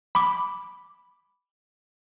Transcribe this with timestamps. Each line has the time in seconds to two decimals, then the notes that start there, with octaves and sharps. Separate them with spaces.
0.15 B5 D6